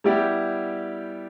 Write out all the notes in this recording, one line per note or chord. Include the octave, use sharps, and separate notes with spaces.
G3 B3 E4 G4 D5